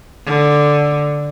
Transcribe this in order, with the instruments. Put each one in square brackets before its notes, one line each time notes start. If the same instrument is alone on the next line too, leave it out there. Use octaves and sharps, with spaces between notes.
[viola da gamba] D3